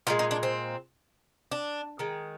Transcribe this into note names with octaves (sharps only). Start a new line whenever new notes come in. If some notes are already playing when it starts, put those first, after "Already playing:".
A#2 F3 G#3 F4
D#4
D4
C4
D4
D#3 G#3